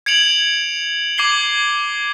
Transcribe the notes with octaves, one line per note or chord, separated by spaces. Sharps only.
G#6 C#7 D7 F7 F#7
D6 G#6 C7 G7